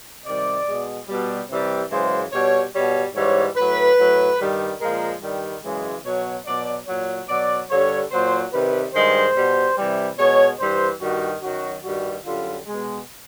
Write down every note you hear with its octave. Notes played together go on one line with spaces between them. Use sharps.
C3 D#3 G3 D5
B2 G#3
B2 G3
C3 E3 G3
F#2 C#3 E3 G#3 C5
B2 G3 C#5
B2 G3 C#5
G#2 E3 G3 C#5
A2 F#3 B4
A2 F#3
G2 D#3 G3
A#2 F3 G#3 A#4
G2 D#3 G3
F#2 C#3 E3 G#3
B2 F#3 C#5
B2 F#3 D5
A#2 F#3 C#5
B2 F#3 D5
G2 D3 G3 C#5
A#2 F#3 C5
C3 D#3 G3 B4
G2 D#3 G#3 C5
B2 G3
C3 E3 G3
B2 G#3 C#5
G2 E3 G3 C5
G2 D#3 G3 F#4
F#2 D#3 F#3 F#4
G2 D#3 G3 F#4
F#2 D3 G3 F4
B2 G#3